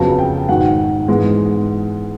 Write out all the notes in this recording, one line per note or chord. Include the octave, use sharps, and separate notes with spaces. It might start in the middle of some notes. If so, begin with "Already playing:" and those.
Already playing: F2 C#3 F#3 B3 A5
G5
G#2 D#3 F#3 F#5
G#2 E3 G#3 B3